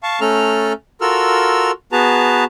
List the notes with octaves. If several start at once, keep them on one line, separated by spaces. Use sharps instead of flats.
F5 A5 C#6
A3 C#4 A4 A#5 F6
F4 F#4 A4 A#4 E6 F6
B3 F#4 G#4 B4 A5 A#5